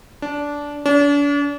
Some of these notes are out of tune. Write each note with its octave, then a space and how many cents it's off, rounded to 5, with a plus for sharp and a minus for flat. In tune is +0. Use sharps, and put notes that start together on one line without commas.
D4 -15
D4 -40